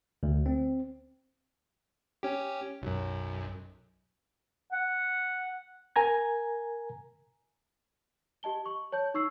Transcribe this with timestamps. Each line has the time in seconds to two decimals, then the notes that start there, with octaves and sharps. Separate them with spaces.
0.23 D2
0.46 C4
2.23 C#4 G4
2.82 B1 F#2
4.72 F#5
5.96 A#4 G#5 A#5 G#6
8.43 G4 D#5 A5 G7
8.66 C#6
8.92 C#5 A5 G6
9.14 D#4 C#6 E6 C7